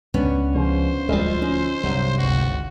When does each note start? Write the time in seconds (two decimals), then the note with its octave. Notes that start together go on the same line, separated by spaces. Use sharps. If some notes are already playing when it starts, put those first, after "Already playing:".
0.14 C#2 B3 C#4 D4
0.55 C#3 F3 C5
1.08 D1 D2 F3 G3 G#3
1.42 C#4 D#4
1.83 C2 G2 C3 F#3
2.18 G1 C#2 F#4